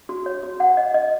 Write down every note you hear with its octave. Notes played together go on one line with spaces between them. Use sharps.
F#4
C#5
F#4
F#5
D#5
D#5